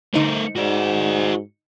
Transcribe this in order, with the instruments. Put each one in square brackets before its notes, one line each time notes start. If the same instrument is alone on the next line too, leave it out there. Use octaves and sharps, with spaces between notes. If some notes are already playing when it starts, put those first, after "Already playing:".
[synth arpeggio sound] D3 D#4 C5 [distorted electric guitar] A3 A#4
[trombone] G#2 [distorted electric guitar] F#4 D5